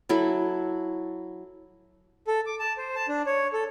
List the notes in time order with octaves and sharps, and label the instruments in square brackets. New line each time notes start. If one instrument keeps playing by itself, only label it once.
[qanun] F#3 E4 A4
[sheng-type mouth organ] A4
D6
A5
C5
A5
D4
C#5
A4